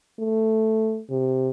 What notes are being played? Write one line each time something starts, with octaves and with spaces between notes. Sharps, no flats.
A3
C3